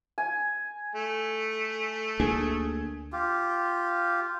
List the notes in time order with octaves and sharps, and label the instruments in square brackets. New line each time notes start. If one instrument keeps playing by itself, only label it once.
[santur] G#5
[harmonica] A3
[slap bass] D2 A#3 D4 [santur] G#4
[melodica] F4 G4